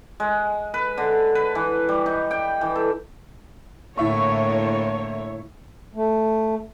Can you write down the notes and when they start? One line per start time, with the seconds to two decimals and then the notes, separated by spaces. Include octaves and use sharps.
0.20 G#3
0.74 B4
0.98 D3
1.35 B4
1.55 E3
1.89 G3
2.06 D#4
2.31 G5
2.61 E3
2.75 A4
3.98 A2 D3 A#3 E4 C#5 E5 C#6
5.95 A3